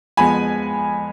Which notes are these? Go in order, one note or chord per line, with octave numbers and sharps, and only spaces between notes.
F2 F3 G#3 B3 G#5 B5